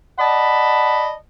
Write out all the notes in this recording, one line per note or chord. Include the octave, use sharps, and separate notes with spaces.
D5 D#5 F#5 A5 B5